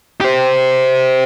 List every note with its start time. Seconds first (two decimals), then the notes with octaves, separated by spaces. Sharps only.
0.21 G4 C5